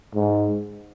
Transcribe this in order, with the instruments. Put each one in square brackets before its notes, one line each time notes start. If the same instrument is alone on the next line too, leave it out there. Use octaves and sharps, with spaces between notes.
[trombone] G#2